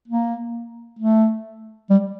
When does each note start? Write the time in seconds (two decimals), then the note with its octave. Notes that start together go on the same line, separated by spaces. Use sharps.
0.08 A#3
0.99 A3
1.90 G3